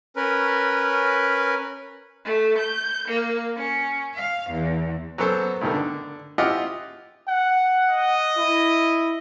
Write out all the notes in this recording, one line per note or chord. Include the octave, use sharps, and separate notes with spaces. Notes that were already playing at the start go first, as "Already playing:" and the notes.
C#4 A#4 B4
A3
G6
A#3
C#4
F5
E2
F#3 A#3 B3 A4 C5
G2 B2 D#3 A3 A#3
D3
E4 F4 G4 D#5 E5 F#5
F#5
D#5
E4